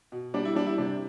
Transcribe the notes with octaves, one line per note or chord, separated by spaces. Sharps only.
B2
G3 D4
E4
G3 D4
E4
C3 D4